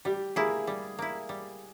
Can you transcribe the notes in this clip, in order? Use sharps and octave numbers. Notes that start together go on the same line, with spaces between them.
G3 G4
A#3 E4 G#4
G3
A#3 E4
G3